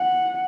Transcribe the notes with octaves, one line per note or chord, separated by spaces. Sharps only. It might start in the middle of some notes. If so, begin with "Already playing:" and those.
Already playing: F#5